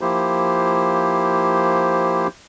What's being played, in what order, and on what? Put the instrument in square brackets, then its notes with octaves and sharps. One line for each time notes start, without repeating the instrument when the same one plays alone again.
[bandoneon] F3 A#3 E4 G4 C5